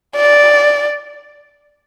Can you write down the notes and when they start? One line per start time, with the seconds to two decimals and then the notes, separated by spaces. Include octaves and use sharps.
0.16 D5